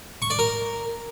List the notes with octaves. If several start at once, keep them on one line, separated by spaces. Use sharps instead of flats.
C#6
D5
A#4